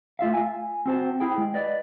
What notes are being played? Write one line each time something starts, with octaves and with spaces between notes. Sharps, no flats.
A3 F4 E5 F5
G#5
C4 F#4 C5 A5
E4 G#4 G5
G#3
B4 D5 D#5